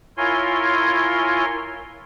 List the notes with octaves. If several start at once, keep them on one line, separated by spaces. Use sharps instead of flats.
E4 F4 A#4 C#5 G#5 C6